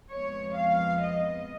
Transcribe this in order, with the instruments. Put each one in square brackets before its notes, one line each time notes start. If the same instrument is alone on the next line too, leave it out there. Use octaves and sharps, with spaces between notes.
[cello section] F2 F3 G#3 B3 C#5
F5
D#5